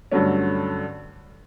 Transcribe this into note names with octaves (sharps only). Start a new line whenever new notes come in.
G2 D3 F#3 A3 C#4